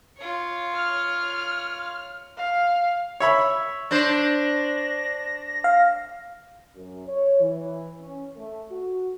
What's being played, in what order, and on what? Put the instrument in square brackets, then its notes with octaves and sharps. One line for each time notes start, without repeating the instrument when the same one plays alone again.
[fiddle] F4 C#5
[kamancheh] F6
F5
[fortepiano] C#5 E5 B5
[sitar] D4 C5 [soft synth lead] A#6
[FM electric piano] F5
[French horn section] F#2
C#5
E3
C#4
A3
F#4